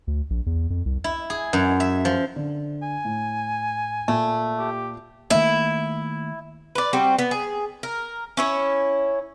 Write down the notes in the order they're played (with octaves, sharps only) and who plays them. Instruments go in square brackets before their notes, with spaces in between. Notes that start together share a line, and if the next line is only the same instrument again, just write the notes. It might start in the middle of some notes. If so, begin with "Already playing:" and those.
[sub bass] D2
A#1
E2
F2
C2
[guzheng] E4
G#4
F#2
E5
F3
[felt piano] D3
[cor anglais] G#5
[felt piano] A2
[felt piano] A#2 [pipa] A3
[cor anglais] G4
[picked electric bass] D#3 A3 A#3 [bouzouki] E4
[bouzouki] B4 D5
G3 C4 F#4
B3
G#4
A#4
C#4 E4 C#5